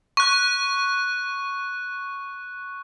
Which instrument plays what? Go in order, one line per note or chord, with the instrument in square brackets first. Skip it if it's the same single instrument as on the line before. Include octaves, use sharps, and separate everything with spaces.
[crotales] C#6 F#6